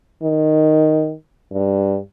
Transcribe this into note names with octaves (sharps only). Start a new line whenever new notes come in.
D#3
G2